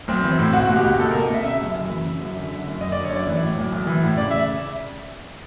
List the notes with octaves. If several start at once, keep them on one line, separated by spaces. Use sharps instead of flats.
B1 C4
E3
C4
A2
C#2 F#4
B2 F#4
G4
C#2
B2 A4
C#2 A#4
D#5
B2 E5
C#3 E5
F#2
F#1
E3
C#3
F#2
D3
F#2
F#1
F#1 D#5
D3 D5
C#5
F#2 D5
E3
A2
B1
B1
E3
A2
C#3 D5
E5